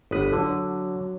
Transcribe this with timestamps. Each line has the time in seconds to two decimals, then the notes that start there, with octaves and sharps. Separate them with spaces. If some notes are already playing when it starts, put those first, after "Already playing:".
0.11 G1 B4 D#6
0.33 D3 F#3